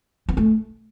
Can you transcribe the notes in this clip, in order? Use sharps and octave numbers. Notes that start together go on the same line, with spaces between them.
B3
A3